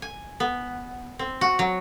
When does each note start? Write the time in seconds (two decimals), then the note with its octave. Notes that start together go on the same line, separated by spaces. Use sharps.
0.02 G#5
0.40 B3
1.19 C4
1.41 F#4
1.59 F#3